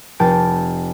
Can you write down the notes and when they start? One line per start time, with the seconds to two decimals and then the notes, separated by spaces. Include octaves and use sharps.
0.19 F1 G5 A5 A6 D7